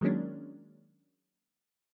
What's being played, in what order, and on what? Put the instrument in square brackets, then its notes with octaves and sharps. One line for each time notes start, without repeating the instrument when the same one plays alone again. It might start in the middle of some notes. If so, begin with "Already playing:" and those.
[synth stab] D#3 F#3 G#3 A#3 C#4 D4